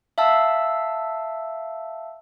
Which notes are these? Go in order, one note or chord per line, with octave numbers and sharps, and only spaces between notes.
E5 F5 A5 E6